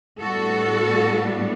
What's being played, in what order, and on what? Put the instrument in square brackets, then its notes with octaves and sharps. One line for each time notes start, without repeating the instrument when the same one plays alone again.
[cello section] A2 G3 B3 D4 F#4 A4